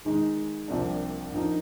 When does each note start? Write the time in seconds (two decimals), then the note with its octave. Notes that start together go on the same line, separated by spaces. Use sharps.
0.05 D#3 G#3 D#4
0.68 C2 C3 F3 A#3 D4
1.32 G2 F3 A#3 D#4